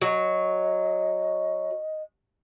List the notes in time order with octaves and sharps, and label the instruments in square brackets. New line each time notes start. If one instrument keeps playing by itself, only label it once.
[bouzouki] F#3 [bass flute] D#5